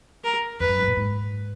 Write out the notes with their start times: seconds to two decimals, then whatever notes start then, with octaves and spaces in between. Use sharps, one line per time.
0.24 A#4
0.60 F2 B4
0.69 F#2
0.79 G#2
0.88 A#2
0.97 G#2